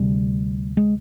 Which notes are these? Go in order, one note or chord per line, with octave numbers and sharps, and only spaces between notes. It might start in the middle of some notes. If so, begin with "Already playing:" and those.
Already playing: D2 C3 G3
G#3